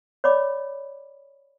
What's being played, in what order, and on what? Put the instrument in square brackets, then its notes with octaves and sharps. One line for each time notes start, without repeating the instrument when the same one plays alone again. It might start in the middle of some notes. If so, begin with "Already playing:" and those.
[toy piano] C#5 D5 B5 D6